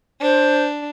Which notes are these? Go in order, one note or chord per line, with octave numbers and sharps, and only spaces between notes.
D4 C5